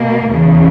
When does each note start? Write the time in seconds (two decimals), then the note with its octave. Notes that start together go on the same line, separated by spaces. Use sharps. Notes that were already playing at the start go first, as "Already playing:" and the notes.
Already playing: B2 A#3
0.28 E2 C#3 E3